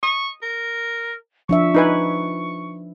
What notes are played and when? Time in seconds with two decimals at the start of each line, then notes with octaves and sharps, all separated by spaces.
0.03 C#6 D#6
0.42 A#4
1.49 F3 D4 E5 C#6
1.75 D#4 B4 G#5